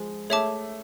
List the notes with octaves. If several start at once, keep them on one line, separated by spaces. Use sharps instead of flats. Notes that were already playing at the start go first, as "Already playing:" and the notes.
Already playing: F3 G#3
A3 G#4 C#5 E5 A5 D6